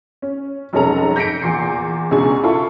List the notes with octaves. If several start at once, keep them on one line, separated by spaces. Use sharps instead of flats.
C#4
F1 B1 G#3 C#4 A4 A#5
G6 A#6 B6 C#7 D7
E2 A#2 C7
C#2 B2 G#3 D4 G#5 C#6
E4 F4 A4 C#6